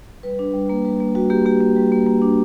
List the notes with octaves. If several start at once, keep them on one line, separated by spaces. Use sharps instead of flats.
G3 B4
D4
G3
A#3
G3
A#3
G3 F#4
A#3 G4
A#3 G4
A#3
G3
A#3
A#3
D4